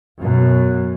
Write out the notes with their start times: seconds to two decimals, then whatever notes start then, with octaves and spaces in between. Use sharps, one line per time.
0.20 F#2 B2